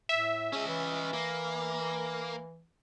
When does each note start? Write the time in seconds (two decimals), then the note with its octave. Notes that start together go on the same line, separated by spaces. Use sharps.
0.09 A2 E5
0.53 C#4 G#4 D#5
0.67 E3
1.13 A#3